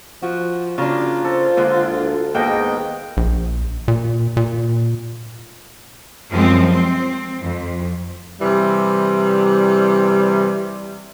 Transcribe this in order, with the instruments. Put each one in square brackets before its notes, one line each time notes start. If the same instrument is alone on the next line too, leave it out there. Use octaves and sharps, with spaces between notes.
[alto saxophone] F3 [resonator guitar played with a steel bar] F#4
[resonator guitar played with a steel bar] C#3 A#3 D4 [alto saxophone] F4 [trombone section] F#4 [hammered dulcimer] A#4
[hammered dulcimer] A4 [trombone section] C5
[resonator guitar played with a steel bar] D3 G#3 A#3
[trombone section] D2
[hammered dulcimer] G#2 B2 D#3 [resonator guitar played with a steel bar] A#3 [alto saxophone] G5
[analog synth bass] A#1
A#2
A#2
[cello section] F#2 F3 G3 G#3 C4
C4
F2
[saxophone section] C3 E3 G3